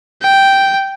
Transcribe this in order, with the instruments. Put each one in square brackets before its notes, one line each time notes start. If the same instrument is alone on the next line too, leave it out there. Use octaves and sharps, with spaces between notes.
[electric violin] G5